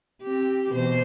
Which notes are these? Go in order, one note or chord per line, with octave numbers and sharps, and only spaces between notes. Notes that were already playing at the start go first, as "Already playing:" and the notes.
C4 G4
E2 B2 C5